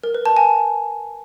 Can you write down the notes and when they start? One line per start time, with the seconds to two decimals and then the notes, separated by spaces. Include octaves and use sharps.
0.03 A#4
0.14 B4
0.26 A5
0.37 G#5